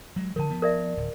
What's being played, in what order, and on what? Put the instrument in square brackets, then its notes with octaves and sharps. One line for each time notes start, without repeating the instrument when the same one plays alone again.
[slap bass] F#3 G#3
[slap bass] D3 F3 [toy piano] A#4 A5
[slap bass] F3 B3
[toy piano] A#4 D5 E5
[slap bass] D1